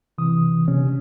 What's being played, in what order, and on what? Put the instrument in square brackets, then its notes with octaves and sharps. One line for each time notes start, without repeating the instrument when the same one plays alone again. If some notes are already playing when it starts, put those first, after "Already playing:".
[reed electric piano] C3 E3 D#6
[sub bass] C3 [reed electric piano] C#4